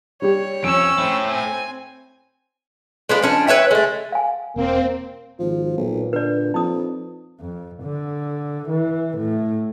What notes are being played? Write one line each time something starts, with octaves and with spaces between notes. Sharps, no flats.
G3 G4 C#5
F2 C#4 E6 D7 E7
A3 C4 E4
G#5
G#3 B3 D4 F4
F3 C#4 D4
B4 C#5 E5 G5
G#3 A3
F5 G#5
E1 A#3 C4
G#1 F3
B1 A#2
D3 B4 D5
F2 F3 D#4 D#6
F2
D3
E3
A2